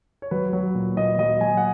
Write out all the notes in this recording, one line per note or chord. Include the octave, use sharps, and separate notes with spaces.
C#5
F#3 B4
F#3
A#2
A#2 D#5
F#3 D#5
F#3 G#5
F#5